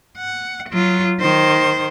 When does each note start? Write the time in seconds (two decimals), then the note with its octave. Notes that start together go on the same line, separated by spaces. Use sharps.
0.18 F#5
0.69 F#3 F4
1.20 D#3 C5